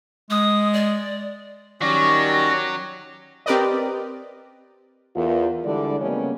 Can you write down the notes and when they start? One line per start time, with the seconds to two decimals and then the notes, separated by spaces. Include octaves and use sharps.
0.30 G#3 D#6
0.73 D5
1.82 D#3 F#3 G3 C#4 F#4 D5 A#6
3.46 C4 G4 A#4 B4 D5 D#5
5.16 E2 F4 A#4
5.64 D3 E3 G3 G#3 D4 D5
6.00 C#3 G3 G#3 A#3 B3 C#4